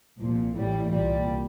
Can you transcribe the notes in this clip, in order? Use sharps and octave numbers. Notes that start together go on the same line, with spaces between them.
C2 A#2 F3
A1 A2 E3 G3
C2 A#2 G3